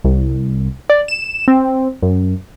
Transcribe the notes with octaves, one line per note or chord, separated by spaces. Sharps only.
C2
D5
E7
C4
F#2